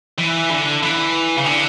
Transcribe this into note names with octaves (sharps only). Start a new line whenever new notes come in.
E3
D3
E3
C#3
D3